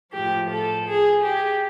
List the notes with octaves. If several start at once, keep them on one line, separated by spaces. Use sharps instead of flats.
A2 F3 G4
A4
G#4
G4